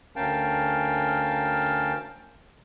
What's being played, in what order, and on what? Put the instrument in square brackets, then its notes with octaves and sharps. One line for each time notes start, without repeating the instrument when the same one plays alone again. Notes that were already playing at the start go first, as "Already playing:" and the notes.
[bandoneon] D2 C#4 A#4 F5 G5 A5